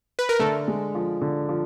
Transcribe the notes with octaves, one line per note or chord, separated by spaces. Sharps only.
B4
A#4
D3 A3 A4
G#3
F3
D3
F3